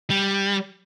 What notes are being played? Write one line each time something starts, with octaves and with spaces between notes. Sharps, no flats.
G3